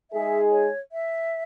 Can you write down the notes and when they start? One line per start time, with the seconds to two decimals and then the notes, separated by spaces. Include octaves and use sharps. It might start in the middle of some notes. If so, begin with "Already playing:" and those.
0.11 G#3 D#4 G#4 E5
0.51 C#5
0.92 E5